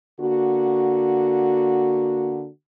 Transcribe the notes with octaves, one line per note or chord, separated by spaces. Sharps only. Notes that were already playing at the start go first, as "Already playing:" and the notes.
D3 A#3 F#4